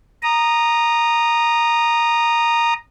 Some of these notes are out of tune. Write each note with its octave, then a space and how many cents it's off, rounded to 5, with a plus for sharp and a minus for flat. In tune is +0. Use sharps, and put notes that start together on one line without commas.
A#5 +0 D#6 -20